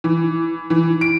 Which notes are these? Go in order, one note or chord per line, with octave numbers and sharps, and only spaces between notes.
E3
E3
D7